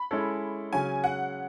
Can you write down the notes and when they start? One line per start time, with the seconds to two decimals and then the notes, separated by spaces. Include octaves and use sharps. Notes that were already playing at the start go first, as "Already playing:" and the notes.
Already playing: B5
0.11 G#3 C#4 E4 A4 C#5
0.73 C#3 F#3 C#4 G#5
1.04 F#5